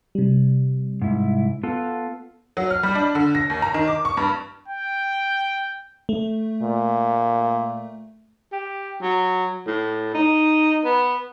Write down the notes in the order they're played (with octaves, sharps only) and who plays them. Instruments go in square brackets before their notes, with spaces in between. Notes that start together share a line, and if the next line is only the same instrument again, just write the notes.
[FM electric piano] C3 G3
[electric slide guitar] G#2 E4
B3 F4 A4
[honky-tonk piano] F#3
F6
G3
D4
D3
A#6
D#2
A#5
D#3
D6
C#6
G2
[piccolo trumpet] G5
[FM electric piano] A3
[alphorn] A#2
[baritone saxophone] G4
F#3
A2
D#4
B3